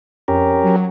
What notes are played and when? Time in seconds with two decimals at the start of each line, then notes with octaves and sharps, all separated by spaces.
0.28 F2 C#4 G4 A#4
0.63 F#3